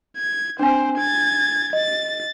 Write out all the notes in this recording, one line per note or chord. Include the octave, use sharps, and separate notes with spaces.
G#6
C4 D4 C5 G#5
G#6 A6
D#5 A6